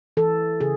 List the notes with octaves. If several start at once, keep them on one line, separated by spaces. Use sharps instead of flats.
E3 A4
C#3 G#4